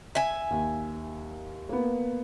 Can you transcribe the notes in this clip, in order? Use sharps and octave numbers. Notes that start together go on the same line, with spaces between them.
E5 G#5
D#2
A#3 B3